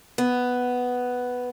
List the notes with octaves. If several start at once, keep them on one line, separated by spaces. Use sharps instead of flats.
B3